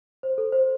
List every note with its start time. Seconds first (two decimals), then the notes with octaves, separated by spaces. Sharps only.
0.23 C5
0.38 A4
0.52 C5